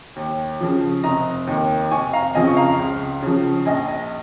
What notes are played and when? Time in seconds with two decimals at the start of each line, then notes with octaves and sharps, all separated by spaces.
0.16 D#2
0.61 C#3 F3
1.04 F1 A#5 D#6
1.47 D#2 D#3
1.91 F1 G#5 C#6
2.13 F5 A#5
2.35 F2 C#3 F3 D#5 G#5
2.47 C#6
2.57 F5 A#5
2.79 C#2
3.22 C#3 F3
3.66 A#1 D#5 G#5
3.88 D#5